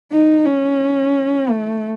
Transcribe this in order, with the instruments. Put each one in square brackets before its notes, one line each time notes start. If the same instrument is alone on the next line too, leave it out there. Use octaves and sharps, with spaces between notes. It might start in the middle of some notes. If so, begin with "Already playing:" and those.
[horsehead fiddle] D#4
C#4
A3